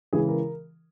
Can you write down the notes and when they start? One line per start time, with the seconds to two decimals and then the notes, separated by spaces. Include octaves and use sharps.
0.13 C#3 E3 G#3 G#4
0.28 A#4